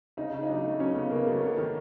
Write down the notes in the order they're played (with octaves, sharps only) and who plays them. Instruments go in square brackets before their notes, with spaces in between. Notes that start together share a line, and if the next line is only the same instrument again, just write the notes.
[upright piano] C#3 [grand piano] D#4
[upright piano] C#3
[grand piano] D#4
[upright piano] F#3 [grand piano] D4
[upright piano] A3
[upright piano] F#3 [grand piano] C#4
[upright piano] C#3 [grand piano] B3
[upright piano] C#3 [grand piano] A#3
[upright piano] F#3 [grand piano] A3
[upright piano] B3
D#3